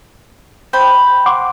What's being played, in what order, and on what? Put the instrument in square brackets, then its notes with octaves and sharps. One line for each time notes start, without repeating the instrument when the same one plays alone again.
[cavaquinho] C5 G5 B5
[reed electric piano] F#5 C6 D6